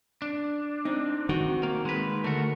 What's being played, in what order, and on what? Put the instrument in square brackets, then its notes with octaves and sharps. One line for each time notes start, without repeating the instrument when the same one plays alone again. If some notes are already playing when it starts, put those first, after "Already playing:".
[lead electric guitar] D4
[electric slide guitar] C4 [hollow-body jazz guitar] D#4
[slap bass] D#3 [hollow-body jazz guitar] F#4
[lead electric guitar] A#3
G#3 B4
[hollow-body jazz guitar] D2 [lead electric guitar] A3 F#4 [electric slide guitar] A#4